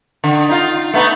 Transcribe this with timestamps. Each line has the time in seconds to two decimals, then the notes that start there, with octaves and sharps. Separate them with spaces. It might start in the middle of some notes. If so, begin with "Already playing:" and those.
0.24 D3
0.49 D#4 F4
0.94 A3 B3 D#4